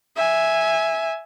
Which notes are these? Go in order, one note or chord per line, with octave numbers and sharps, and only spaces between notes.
E5 G#5